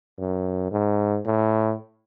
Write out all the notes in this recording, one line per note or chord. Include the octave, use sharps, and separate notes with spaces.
F#2
G#2
A2